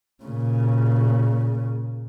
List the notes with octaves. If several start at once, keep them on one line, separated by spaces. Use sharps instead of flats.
A#2 C#3